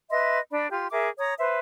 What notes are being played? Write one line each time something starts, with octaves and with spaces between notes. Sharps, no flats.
B4 D#5 E5 C6
D4 D5 B5
F4 G4 C6
G#4 A#4 E5 D6
C#5 A#5 D#6
B4 C5 E5